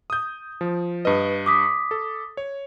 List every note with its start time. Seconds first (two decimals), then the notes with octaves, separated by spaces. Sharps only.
0.10 D#6 G6
0.61 F3
1.05 G2 B4 D#5
1.46 D6 D#6 B6
1.91 A4
2.37 C#5